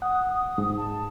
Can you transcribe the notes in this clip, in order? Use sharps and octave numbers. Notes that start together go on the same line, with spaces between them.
F#5 D#6
D#6
G#2
A5